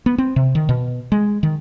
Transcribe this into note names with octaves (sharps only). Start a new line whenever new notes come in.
B3
C4
C3
D#3
B2
G#3
D#3